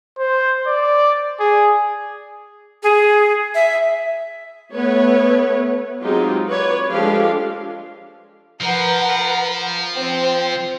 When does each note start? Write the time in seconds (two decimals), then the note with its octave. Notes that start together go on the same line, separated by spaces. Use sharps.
0.18 C5
0.67 D5
1.40 G#4
2.83 G#4
3.55 E5
4.74 A3 B3 B4 C#5
6.02 F#3 G#3 C4 D#4 F4 G4
6.50 B4 C#5 D5
6.90 F3 G#3 D4 G4 A4 F5
8.61 F3 A#4 B4 F#5
9.95 C4